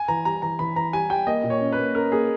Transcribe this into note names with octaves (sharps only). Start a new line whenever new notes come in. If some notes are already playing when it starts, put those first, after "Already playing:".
Already playing: G#5
E3 A#5
G3 A#5
E3 A#5
E3 B5
E3 A#5
G3 G#5
G3 G5
A#3 D#5
A#2
C#5
C#4
B4
A#3
C#4 A#4
A#3 G#4